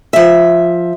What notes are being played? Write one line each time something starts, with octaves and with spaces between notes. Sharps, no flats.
F3 E5